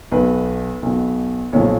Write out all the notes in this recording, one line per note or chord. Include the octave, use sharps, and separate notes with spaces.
B1 B2 B4
B1 B2
B1 A#2 F3 C#5